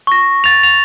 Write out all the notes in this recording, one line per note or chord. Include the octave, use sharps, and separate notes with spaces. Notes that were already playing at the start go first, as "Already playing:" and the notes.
C#6 A#6
A6 F7
F7